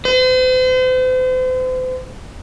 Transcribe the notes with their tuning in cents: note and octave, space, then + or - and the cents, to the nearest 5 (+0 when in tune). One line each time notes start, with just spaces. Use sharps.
C5 -40